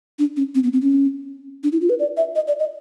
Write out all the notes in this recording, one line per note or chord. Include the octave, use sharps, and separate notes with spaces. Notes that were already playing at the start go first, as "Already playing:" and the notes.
D4
C#4
C4
B3
C4
C#4
D4
E4
F4
B4
D5
E5
D#5
D5
D#5